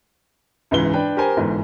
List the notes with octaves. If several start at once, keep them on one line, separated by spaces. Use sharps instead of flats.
C#2 G#2 E3 G7
D4 B4 G5
G4 A#4 C5 G#5
G1 G#2 E3